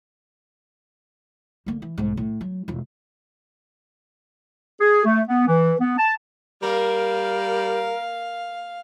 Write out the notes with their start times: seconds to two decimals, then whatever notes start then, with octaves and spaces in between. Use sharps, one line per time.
1.66 D3 A#3
1.82 E3
1.98 B1 G#2
2.17 A2
2.41 F#3
2.68 E1 F4
4.81 G#4
5.05 A3
5.28 B3
5.47 E3
5.80 B3
5.98 A5
6.63 G3 A#3 A#4 F5